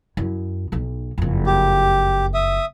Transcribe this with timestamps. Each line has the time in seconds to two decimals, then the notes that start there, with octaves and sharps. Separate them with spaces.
0.17 F#2 E4
0.72 B1 D#4
1.18 F#1 F2
1.47 G4
2.34 E5 D#6